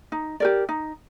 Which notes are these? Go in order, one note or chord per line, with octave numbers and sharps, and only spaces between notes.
D#4
G4 A#4 D5
D#4